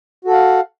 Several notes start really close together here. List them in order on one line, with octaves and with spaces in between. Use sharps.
F#4 A4 F#5 F5